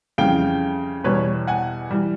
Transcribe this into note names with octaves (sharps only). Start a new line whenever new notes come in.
F2 C#3 E3 G3 F5 G5
E2 B2 G3 B4 C#5
F#5 G#5
E3 G3